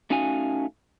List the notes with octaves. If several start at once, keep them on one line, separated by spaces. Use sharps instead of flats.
A3 C#4 D#4 F#4 F5 G#5